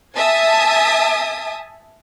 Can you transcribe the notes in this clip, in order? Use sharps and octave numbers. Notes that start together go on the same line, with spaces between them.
E5 G#5 A5 D#6